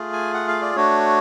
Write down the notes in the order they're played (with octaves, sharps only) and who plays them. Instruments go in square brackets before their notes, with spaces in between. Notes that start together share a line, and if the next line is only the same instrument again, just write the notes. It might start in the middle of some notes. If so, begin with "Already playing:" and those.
Already playing: [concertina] A3 F4 G#4
G#5
F#5
F5
D5
A3 D4 F#4 C#5